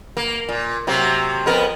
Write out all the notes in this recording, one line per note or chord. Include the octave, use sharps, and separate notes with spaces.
A#3
A#2
C3 F#3 A#3
F2 B3 A#4